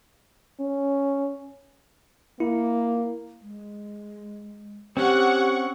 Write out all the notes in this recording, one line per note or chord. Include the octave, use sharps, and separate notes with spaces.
C#4
A#3 E4
G#3
C4 C#4 G4 F#5 C#6